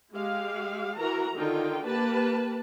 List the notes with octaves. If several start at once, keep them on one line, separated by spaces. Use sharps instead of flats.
G#3 G4 F5
E3 F#4 A#4 A#5
D3 D#3 D#4 F4 G5
A#3 G4 B4 A5